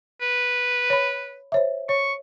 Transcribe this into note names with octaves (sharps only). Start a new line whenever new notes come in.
B4
C#5 B5
C5 C#5 E5
C#5 C#6